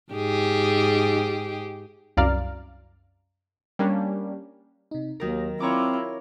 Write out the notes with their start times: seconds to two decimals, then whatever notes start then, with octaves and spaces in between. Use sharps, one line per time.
0.12 G#2 G4 G#4
2.17 C2 F#2 D5 F5 A#5 F6
3.79 G3 A#3 C#4 D4 G4
4.91 C3 D#4
5.20 D#2 D#3 F#3 A#4 A#6
5.60 C4 E4 F4 C#5 A#5 D6